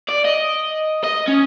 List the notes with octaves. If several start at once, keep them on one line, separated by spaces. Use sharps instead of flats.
D5
D#5
D#5
C#4